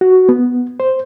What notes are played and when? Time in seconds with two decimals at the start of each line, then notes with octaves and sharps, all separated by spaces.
0.01 F#4
0.29 B3
0.80 C5